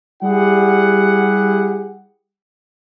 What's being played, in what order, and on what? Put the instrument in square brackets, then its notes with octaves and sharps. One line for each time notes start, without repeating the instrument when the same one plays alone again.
[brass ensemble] G3 E4 G4 G#4 F#5